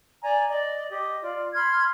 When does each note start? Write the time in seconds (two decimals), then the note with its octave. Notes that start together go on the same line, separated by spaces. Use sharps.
0.22 D5 G#5 A#5
0.48 D5 D#5
0.89 G4 D#5
1.22 F4 D5
1.54 B5 C6 F6 G#6